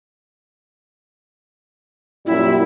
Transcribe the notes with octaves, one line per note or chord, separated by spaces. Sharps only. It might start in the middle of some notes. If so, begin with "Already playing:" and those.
F#2 A#2 G3 E4